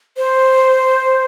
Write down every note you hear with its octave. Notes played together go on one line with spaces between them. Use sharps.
C5